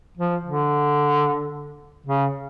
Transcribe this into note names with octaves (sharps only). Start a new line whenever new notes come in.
F3
D3
C#3